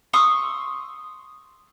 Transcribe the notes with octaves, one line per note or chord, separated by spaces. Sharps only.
C6 C#6 D#6 E6